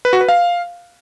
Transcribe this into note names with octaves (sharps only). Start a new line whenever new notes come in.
B4
F#4
B4
F5